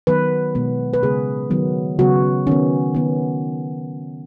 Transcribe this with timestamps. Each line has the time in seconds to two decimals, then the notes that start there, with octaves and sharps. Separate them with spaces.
0.07 D#3 F#3 B3 B4
0.55 B2 G#3 B3
0.94 B4
1.03 C#3 G#3 B3 G#4
1.51 D#3 F#3 B3
1.99 C#3 F#3 B3 F#4
2.47 D#3 B3 C#4
2.95 D#3 B3